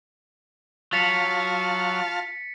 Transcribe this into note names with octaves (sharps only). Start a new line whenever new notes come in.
F#3 F4 F5 A5 A6 B6 C#7